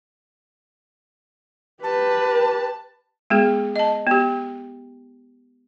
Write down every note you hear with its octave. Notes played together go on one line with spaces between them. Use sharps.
G4 B4 A5
G#3 B3 G#4
D#5 A5
B3 G4